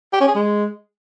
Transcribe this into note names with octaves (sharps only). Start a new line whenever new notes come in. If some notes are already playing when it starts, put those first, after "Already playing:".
G4
C#4
G#4
G#3